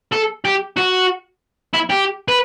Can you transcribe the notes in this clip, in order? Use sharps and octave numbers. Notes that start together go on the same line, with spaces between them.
A4
G4
F#4
E4
G4
B4